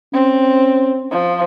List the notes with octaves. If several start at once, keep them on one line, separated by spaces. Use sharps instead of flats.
C4 C#4
F3